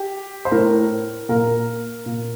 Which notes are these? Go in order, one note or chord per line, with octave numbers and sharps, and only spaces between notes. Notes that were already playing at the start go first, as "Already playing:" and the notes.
Already playing: G4
C5
A2 A#4
A#2 A#4
A#2